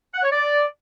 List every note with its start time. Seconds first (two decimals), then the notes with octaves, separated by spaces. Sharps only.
0.13 F#5
0.23 C#5
0.32 D5